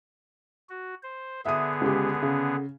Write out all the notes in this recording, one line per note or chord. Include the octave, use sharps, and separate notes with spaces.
F#4
C5
D3 B3 G#4 E5 D#6
C#2 G4
C#3